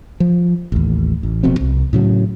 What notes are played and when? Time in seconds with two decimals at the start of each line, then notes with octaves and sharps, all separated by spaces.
0.20 F3
0.72 A1 D#2
1.23 A1
1.43 F1 F2 B2 C4
1.61 C2
1.93 A2 C#3 F#3